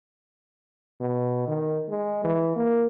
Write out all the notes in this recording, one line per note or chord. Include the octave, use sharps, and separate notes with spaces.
B2
D#3
G#3
E3
A#3